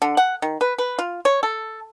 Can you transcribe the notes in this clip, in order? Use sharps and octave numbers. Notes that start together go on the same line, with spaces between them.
D3
F#5
D#3
B4
B4
F4
C#5
A4